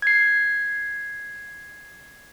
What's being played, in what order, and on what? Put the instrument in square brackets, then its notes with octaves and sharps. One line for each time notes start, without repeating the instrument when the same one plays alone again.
[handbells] G#6 C7